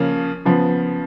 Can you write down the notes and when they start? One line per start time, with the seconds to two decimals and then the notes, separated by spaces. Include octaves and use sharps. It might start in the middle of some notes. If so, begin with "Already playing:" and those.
Already playing: C#3 F3 A#3 C#4
0.45 C#3 F3 B3